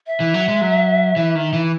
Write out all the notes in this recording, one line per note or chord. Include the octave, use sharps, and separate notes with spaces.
E5
E3
F#3
G#3
F#3
E3
D#3
E3